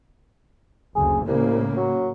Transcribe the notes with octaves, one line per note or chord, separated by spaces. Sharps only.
F#1 D2 G#4
C2 A2 C#3 A#3
F#3